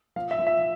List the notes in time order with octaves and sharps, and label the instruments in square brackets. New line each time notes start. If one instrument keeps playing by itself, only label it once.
[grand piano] F3 F5
E5
F3
E5